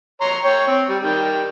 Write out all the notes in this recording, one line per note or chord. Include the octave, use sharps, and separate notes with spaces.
C#5 A#5 C6
C#5 G5
C4
G3
D#3 G3 G5